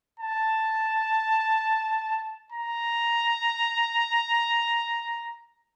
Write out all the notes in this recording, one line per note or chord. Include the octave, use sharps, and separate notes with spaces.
A5
A#5